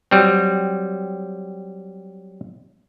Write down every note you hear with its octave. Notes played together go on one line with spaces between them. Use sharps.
F#3 G3 C4